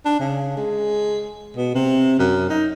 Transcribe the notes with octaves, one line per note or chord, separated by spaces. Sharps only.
D4
C#3
G#3
B2
C3
F#2
D#4